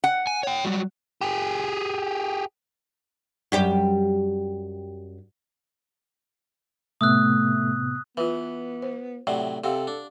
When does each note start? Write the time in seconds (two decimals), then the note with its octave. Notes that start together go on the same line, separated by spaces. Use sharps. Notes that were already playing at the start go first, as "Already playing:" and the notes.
0.04 F#5
0.27 G#5
0.43 C#5 G5
0.65 F#3 G3
1.21 G4 G#4
3.52 F#2 G3 G4
7.01 A2 C3 A3 B3 D#6 E6 F#6
8.17 E3 B3 F4 B4
8.82 C5
9.27 A2 C3 F#3 D5
9.64 C3 C4 G4 A4 F5 F#5
9.87 D4